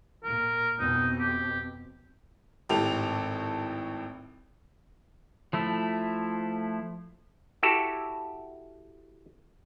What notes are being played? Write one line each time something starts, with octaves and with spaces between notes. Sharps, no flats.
A#2 A#4
F2 B2 C4 D#4
G4
G#1 A2 G4 A4 F7
F3 A3 E4
E4 F#4 G4 A4